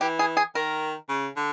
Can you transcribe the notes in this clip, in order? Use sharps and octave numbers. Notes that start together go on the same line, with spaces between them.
E3 G4
G#4
G#4
D#3 A#4
C#3
D3